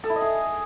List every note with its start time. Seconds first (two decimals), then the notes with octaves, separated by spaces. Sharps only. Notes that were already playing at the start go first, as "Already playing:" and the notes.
0.04 A4
0.10 E4
0.16 D#5
0.22 G#4